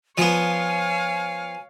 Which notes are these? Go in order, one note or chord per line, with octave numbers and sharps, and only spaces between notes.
F3 B3 C#5 F5 G#5